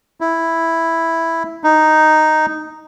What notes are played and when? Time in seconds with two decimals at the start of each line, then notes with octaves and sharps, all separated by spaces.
0.21 E4
1.64 D#4